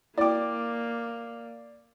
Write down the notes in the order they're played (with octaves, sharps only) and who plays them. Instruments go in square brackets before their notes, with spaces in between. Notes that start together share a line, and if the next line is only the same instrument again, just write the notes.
[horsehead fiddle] A#3 [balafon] E4 G5 [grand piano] D5 D6